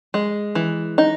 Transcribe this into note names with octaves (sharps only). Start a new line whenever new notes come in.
G#3
E3
D#4